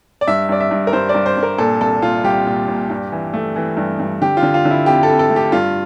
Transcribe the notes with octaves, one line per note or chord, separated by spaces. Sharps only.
D5
G2 E5
G2 D5
E5
G2
A#4
G2 C5
D5
G2
C5
G2
A#4
A#2 A4
C2 A4
A#2 F4
C2 G4
A#2
A#2
G2
E3
A3
E3
G2
G2
D3 G4
F4
D3
F4
D3
E4
F2 G4
A4
F2
A4
A3
G4
G2 F4